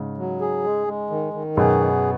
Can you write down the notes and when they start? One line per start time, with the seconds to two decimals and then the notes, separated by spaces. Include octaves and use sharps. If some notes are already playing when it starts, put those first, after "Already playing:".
Already playing: G#2 C#3
0.17 F#3
0.41 G#4
0.64 G#3
0.87 G#3
1.10 D#3
1.34 D#3
1.57 F#2 B2 G#4
1.80 B3